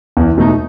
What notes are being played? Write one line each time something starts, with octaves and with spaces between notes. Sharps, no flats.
E2
B2 A3 D#4